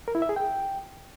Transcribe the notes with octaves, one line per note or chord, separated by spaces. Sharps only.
A#4
E4
E5
G#4
G5